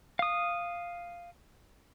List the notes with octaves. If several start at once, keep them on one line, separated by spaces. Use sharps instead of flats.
F5 D#6